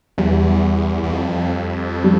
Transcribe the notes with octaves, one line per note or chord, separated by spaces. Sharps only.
E2 G3
E2
F2
G3